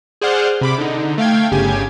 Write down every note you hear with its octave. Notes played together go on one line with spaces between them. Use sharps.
G#4 C5 D5 F#5 F6 G6
C3 B5 D6
D3 D#4
A3 F5 G5 G#6
G1 C#3 G4 G#5 G#6